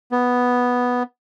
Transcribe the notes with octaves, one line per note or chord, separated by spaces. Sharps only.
B3